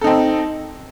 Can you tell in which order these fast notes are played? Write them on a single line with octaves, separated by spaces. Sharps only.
A4 D#4 C4